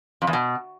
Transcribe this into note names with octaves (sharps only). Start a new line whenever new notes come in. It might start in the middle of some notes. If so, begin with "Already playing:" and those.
F2
E2
B2